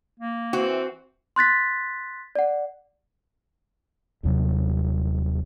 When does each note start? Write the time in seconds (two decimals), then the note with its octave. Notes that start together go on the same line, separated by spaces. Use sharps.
0.20 A#3
0.53 E3 C4 F#4
1.36 C6 F#6 A6 B6
2.35 D5 F#5
4.23 D#1 D#2 C3 F#3